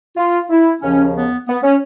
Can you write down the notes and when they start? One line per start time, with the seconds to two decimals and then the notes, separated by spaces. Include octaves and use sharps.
0.17 F4
0.50 E4
0.81 D#2 C#3 F3 C#4
1.14 B3
1.47 B3
1.63 C#4